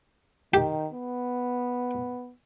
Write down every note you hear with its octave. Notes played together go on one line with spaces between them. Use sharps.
D#3 G4
B3